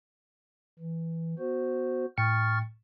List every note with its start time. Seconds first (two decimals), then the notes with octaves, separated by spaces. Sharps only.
0.79 E3
1.39 B3 F#4 C5
2.18 A2 G5 C#6 F6 A6 C#7